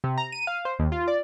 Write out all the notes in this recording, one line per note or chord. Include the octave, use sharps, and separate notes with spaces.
C3
A#5
D#7
F5
C5
D#2
F4
D5